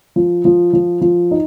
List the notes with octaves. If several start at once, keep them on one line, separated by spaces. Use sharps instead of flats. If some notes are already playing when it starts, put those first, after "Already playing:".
F3
F3
F3
F3
D#4